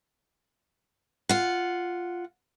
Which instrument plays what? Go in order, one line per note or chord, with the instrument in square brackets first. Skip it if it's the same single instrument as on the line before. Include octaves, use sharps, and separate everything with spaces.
[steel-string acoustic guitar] F4 F#5